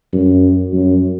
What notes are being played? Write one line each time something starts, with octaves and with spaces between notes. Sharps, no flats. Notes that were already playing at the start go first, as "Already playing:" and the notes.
F#2
F#2